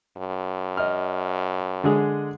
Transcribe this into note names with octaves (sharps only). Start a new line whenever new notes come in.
F#2
D#5 F6
D3 G#3 G#4